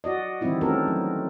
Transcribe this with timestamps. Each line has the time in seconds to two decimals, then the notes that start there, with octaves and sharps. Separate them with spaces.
0.04 F#4 D5 D#5
0.41 D#3 E3 G3 C4 E4 F4
0.61 A3 C4 C#4 F#4 A4 A#4
0.88 F#3